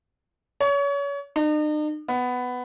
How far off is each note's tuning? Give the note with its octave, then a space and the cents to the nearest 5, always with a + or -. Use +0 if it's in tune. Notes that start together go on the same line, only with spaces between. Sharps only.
C#5 +30
D#4 -45
B3 +10